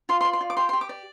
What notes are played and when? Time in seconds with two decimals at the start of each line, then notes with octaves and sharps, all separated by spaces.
0.09 F4 C6
0.21 C6
0.25 D5
0.33 C6
0.41 F4
0.50 D6
0.57 G4 C6
0.69 C6
0.73 G4
0.81 D6
0.89 D5